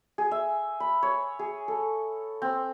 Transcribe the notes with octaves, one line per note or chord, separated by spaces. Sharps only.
G#4
E5
B5
C#5
G#4
A4
C4